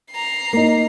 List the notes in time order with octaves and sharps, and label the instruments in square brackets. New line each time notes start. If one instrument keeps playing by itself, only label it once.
[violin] A#5 C7
[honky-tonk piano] A#3 D#4